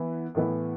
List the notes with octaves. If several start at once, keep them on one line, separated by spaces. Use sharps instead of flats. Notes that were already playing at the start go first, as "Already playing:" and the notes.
Already playing: E3 B3 E4
A2 E3 B3 E4